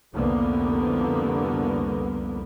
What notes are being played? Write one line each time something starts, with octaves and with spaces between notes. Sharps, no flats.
C2 F2 D3 A#3 B3